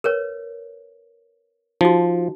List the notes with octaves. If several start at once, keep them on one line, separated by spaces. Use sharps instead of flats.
A#4 B4 C#5
F3 D#4 F#4